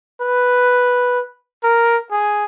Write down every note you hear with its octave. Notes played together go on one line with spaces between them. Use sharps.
B4
A#4
G#4